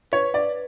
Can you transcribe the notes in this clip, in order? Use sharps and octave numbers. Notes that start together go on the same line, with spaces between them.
B4 C#5
D5